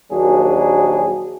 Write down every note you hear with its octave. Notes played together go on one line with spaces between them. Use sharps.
A#1 D#2 F#3 D4 F#4 G#4